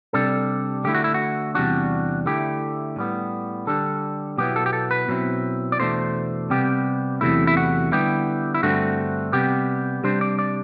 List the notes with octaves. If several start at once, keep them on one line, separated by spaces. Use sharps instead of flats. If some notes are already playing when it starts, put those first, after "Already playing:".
C3 G3 D4 A4
D3 A3 E4 G4
F#4
E4
F#4
E2 C3 G3 D4 F#4
D3 A3 E4 G4
A2 G3 B3
D3 G3 D4 A4
B2 F#3 B3 E4 G4
A4
G4
A4
B4
B2 F#3 C4 E4
D5
E2 B2 A3 D4 C5
C3 G3 B3 G4
E2 C3 F#3 A3 E4
E4
F#4
D3 G3 B3 E4 G4
E4
G2 D3 A3 C4 F#4
C3 G3 B3 G4
C3 G3 D4 C5
D5
D5